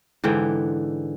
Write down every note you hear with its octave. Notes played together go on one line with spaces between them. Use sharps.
G#2 D3 E3 G5